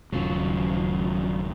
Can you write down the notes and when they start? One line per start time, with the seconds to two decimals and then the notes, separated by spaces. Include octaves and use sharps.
0.13 D#1 G2 C#3 F#3 F4